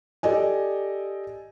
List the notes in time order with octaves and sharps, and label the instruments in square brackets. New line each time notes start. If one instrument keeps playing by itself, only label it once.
[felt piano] G4 A4 D5 D#5 G#5